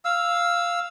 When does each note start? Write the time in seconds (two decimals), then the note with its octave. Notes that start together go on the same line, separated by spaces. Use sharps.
0.05 F5 E6